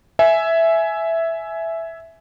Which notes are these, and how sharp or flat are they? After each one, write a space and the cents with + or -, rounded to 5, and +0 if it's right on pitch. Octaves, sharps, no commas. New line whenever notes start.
E5 +0 G#5 +15